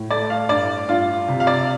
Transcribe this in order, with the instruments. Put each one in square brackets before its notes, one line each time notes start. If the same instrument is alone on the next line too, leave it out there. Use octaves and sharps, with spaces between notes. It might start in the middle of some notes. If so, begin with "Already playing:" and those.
Already playing: [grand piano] A2
A3 D5
F5
G2 D5
G2 F4
C3
F5
D5